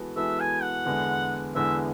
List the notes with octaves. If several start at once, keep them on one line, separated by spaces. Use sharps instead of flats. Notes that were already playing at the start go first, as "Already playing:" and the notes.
Already playing: E3 G#3 B3 F#4 A4
E3 G#3 B3 F#4 A4 E5
G#5
F#5
E2 D3 G#3 B3 E4
E2 D3 G#3 B3 E4 E5